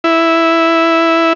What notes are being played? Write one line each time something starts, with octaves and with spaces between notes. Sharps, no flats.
E4